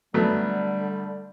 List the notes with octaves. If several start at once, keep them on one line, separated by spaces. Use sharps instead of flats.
D3 F#3 G3 A3 B3